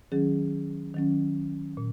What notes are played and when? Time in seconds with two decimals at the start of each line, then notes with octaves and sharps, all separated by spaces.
0.12 D#3 F#3 C#4 G#4
0.94 D#3 F#3 C#4
1.77 A#2